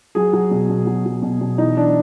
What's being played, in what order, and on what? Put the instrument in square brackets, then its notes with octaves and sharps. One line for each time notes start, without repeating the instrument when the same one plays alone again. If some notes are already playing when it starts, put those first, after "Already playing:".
[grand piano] F#3 G#4
F#3
B2
B2
F#3
F#3
B2
B2
E3 D#4
E3 D4